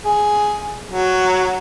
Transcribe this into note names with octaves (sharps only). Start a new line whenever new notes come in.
G#4
F#3